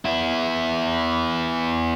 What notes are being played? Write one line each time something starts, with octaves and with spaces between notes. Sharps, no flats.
B3 E4